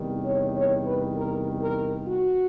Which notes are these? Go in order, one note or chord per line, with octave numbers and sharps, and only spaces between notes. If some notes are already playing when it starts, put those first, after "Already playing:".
Already playing: E2 C3 D#3 G3
C#5
C#5
B4
A#4
A#4
F#4